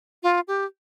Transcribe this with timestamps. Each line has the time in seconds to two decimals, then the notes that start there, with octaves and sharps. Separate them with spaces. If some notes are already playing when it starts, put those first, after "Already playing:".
0.23 F4
0.48 G4